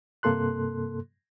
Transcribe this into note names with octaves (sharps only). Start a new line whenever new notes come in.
G2 C3 A#3 A4 C6 F#6